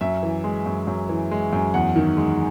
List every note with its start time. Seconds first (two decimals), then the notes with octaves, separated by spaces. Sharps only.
0.01 F#2 E5
0.23 E3
0.44 G#3
0.66 F#2
0.87 F#2
1.09 E3
1.31 G#3
1.53 F#2
1.74 E2 F#5
1.96 D#3
2.17 G#3